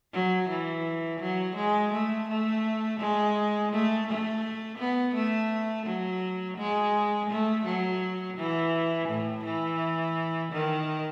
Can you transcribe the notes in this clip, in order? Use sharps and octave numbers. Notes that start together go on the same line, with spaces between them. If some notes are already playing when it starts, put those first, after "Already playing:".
F#3
E3
F#3
G#3
A3
A3
G#3
A3
A3
B3
A3
F#3
G#3
A3
F#3
E3
A2
E3
D#3